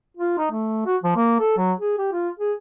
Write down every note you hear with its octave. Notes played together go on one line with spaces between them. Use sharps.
F4
D#4
A3
F#4
F3
A#3
A4
F#3
G#4
G4
F4
G#4